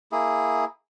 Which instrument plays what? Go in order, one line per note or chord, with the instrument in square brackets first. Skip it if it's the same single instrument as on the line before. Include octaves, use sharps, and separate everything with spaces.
[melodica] A#3 E4 G#4